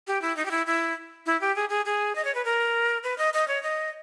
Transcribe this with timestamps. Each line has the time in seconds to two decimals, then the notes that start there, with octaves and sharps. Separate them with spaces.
0.07 G4
0.22 E4
0.37 D#4
0.46 G4
0.51 E4
0.67 E4
1.26 E4
1.41 G4
1.56 G#4
1.70 G#4
1.85 G#4
2.15 D#5
2.25 C#5
2.35 B4
2.45 A#4
3.04 B4
3.18 D#5
3.34 D#5
3.48 C#5
3.63 D#5